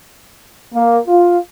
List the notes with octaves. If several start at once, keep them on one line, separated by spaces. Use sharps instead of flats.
A#3
F4